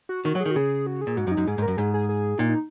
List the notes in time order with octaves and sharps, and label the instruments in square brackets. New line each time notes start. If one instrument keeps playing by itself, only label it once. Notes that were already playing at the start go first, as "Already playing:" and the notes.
[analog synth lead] F#4
[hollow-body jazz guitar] D#3 [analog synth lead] F#4
[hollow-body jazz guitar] F#3
[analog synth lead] G#4
[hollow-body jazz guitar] D#3
[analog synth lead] F#4
[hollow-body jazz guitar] C#3 [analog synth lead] G#4
[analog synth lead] F#4
G#4
[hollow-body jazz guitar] A#2
[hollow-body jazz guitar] G#2 [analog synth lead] F#4
[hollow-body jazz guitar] F#2
[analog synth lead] D#4
[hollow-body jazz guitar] F#2
[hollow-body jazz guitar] G#2 [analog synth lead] G#4
[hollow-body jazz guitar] G#2
[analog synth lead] A#4
[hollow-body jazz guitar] F#2
[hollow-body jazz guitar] G#2 [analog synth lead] G#4
[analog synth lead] G#4
G#4
[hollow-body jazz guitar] A#2 [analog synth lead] D#4
[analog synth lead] D#4